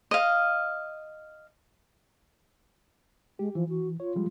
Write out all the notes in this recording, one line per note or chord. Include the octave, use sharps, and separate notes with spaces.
D#5 F5
G#3 G4
E3 F3
F#4
F4 C#5
F3 G3 G#3